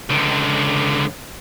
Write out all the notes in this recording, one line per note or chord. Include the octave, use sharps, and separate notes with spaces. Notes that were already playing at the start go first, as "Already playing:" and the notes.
C#2 D3